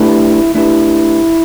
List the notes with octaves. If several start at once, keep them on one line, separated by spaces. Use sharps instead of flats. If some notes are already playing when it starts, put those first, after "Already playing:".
Already playing: A3 D4 E4 G4 B4
A3 D4 E4 G4 B4